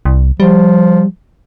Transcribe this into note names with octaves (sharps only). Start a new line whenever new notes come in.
C2
F3 G3